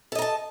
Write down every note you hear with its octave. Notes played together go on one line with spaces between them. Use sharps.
A4 D#5 A5 A#5